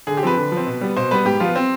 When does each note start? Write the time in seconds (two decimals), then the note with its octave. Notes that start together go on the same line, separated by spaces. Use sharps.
0.07 D3 G#4
0.17 G4
0.23 F3 C4 B4
0.37 D3
0.52 F3
0.57 C4
0.67 B2
0.81 G3 B3
0.97 B2 C5
1.11 G3 B3 B4
1.25 G#2 G4
1.40 F3 B3 F4
1.56 C4